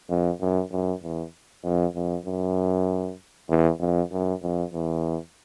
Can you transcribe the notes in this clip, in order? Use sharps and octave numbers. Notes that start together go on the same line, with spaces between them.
F2
F#2
F#2
E2
F2
F2
F#2
E2
F2
F#2
F2
E2